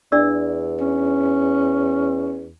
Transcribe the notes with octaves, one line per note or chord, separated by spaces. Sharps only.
E2 D4 D5 E6
C#4